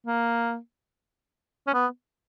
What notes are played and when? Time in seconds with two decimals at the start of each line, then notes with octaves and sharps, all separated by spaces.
0.06 A#3
1.67 C#4
1.74 B3